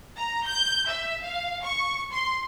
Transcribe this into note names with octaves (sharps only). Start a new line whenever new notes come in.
A#5
G6
E5
F5
C#6
C6